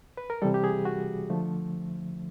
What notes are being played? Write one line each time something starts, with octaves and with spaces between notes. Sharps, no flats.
B4
A#4
C3 E3 G3 A4
G4
G#4
F#4
D3 F3 A3